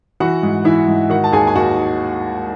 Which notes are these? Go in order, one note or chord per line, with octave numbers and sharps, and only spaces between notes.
E3 F#4 F#5
G#2
E3 E4 E5
G#2
D#3 F#4 F#5
A5
D#2 G#4 G#5
G#5
D#2 F#4 F#5